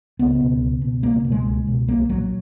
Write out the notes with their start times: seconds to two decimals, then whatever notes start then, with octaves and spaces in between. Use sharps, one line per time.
0.19 C#2 B3
0.40 B2
0.61 C#2
0.82 B2
1.03 C#2 A#3
1.25 B2
1.32 G#3
1.45 C#2
1.67 B2
1.88 B1 A#3
2.09 A#2 F#3